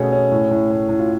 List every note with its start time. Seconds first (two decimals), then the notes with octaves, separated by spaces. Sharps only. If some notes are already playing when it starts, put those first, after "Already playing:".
Already playing: B2 A3 C#4 G#4
0.12 C#4
0.31 A2
0.51 A2
0.70 A2
0.89 A2
0.99 F4